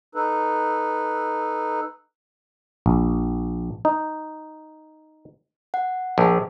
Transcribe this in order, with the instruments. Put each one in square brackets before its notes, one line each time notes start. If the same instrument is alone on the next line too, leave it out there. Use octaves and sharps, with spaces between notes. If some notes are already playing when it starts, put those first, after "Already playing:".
[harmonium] D#4 A4 B4
[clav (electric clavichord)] A#1
D#4
[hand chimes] F#5
[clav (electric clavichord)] A#1